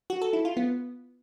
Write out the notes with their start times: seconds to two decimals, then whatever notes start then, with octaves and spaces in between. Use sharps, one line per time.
0.10 F#4
0.22 A4
0.33 E4
0.45 F4
0.57 B3